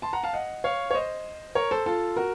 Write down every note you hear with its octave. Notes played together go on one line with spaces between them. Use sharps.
A5 C6
F#5 A#5
F5 A5
D#5 F#5
C#5 F5
C#5
C5 D#5
A#4 C#5
A4 C5
F4 A4
F#4 A#4